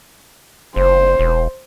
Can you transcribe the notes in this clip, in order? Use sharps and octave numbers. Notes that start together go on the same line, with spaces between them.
F#1 C5
E1